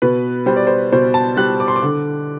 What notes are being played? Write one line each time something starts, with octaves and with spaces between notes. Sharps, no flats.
B2 B4
G3 C5
D5
C5
B2 C5
A5
G3 F#6
D6
C6
D6
D3